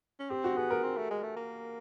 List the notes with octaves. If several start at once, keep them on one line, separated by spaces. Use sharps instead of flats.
C#4
C4 G4
F#4
B3 G#4
A#4
C4
A3
G#3
A3
A#3